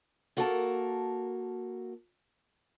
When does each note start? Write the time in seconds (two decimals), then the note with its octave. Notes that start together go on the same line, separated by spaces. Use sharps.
0.37 A#3 F#4 A4 A#4 G5 A5